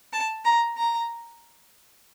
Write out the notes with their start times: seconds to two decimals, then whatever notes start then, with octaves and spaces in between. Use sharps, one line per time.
0.13 A5
0.44 A#5
0.77 A#5